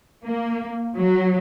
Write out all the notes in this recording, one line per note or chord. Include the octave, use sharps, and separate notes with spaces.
A#3
F#3